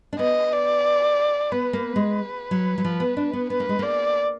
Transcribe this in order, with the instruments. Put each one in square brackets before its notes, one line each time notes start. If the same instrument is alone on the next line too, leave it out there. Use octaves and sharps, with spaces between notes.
[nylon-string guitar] D4
[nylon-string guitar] B3 [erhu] D#5
[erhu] D5
[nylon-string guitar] B3 [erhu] B4
[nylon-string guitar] A#3
G#3
F#3
F#3
F3
B3
D4
B3
[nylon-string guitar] B3 [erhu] B4
[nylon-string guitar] A#3
G#3
[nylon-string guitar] A#3 [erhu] D5